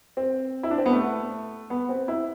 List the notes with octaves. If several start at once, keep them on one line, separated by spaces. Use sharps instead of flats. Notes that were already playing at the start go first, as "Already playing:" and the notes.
C4
E4
D4
C4
B3
A3
B3
C4
E4